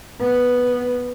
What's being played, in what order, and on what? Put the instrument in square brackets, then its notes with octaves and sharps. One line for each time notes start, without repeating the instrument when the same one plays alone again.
[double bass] B3